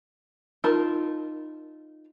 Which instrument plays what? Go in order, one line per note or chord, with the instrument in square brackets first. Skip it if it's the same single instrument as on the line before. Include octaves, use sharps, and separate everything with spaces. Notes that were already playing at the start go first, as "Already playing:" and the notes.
[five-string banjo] D#4 F4 A#4 A5 B5